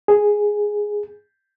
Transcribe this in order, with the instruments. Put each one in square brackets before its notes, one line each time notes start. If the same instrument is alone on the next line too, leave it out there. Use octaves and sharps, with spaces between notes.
[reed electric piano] G#4